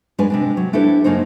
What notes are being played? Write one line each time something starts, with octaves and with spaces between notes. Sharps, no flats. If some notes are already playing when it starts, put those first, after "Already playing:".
F#2 G#3 D4 B4 G#5
C3 G#3 D4
F#3
D4 E4 G4 A4 B4 C5
F#2 C#3 A#3 D#4 C5